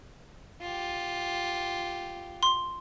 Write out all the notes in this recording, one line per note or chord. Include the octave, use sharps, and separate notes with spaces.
F4 G4
C6